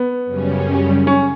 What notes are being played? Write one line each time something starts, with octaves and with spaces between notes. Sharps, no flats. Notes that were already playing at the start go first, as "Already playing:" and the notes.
Already playing: B3
F#2 C#3 G3 C#4
C#4